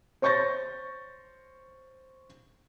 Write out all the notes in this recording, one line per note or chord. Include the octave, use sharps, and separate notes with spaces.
C5 C#5 C#6 G6 A6 A#6